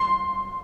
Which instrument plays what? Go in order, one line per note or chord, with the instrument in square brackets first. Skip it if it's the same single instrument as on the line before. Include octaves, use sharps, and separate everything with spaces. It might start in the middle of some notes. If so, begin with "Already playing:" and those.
Already playing: [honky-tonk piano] C6